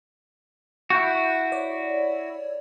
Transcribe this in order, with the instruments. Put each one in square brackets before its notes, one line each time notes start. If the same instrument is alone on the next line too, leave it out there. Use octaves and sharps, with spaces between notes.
[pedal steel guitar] E4 F#4 [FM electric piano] C#6 F#6 G6
[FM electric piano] C#5 D5